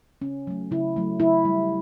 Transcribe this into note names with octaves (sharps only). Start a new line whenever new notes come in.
C#3 C#4
F#3 A3
C#3 E4
F#3 A3
C#3 E4
G3